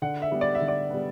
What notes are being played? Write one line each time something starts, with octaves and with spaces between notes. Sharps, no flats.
D3 F#5
E5
G3 B3
D5
E5
D3
D5
G3 B3